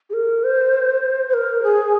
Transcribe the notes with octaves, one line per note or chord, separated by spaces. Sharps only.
G#4
A#4
C5
C5
A#4
G#4